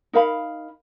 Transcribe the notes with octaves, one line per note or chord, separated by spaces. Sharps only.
D#4 A#4 F5 B5